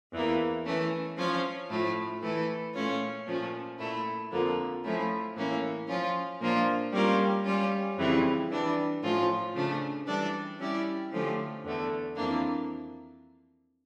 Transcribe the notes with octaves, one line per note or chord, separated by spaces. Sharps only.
E2 E3 A#3
E3 A3 C#4
F3 C#4 F4 C#5
A2 F3 A3 E4
E3 A3 E4 A4
A#2 A3 C#4 F4 C#5
A#2 F3 A3 C#4
A#2 A3 E4
F2 D3 F3 A#3
F3 A3 C#4 E4
A2 E3 A#3 C#4
F3 C#4 F4
A#2 F3 A#3 D4 F4
G3 A#3 C#4 F4 A#4
G3 C#4 F4
F2 C#3 E3 G3
E3 G3 D4
A2 F3 C#4 F4
C#3 F3 A3 D4
E3 G3 D4 A4 D5
G3 C#4 E4 G4 D5
D3 F3 A3 C#4 G4
E2 D3 A3
F2 E3 A#3 D4